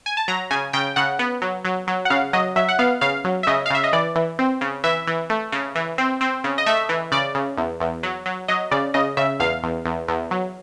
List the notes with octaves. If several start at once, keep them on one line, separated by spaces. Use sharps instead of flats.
G#5
A5
F#3 A#5
C#3 G#5
C#3 G5
C#3 F#5
B3
F#3
F#3
F#3
F#5
C#3 F5
F#3 D#5
F#3 E5
F#5
B3 F5
C#3 F5
F#3
E5
C#3 D#5
F5
C#3 E5
D#5
E3 D5
E3
C4
C#3
E3 E5
E3
A3
C#3
E3
C4
C4
C#3
D#5
A3 E5
E3
C#3 D5
C#3
E2
E2
F#3
F#3
F#3 D#5
C#3 D5
C#3 D#5
C#3 E5
E2 F5
E2
E2
E2
F#3